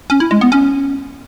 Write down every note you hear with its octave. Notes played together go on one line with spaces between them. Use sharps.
C#4
E4
G#3
B3
C#4